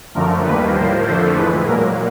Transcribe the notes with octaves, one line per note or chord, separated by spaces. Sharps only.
F#2 D3 F3 A3 A#4
D#2 D#3 G3 A#3 B4
A2 F3 A#3 C5
F2 D3 F3 A3 C5
A2 E3 G#3 B4
A#2 F#3 A#3 A#4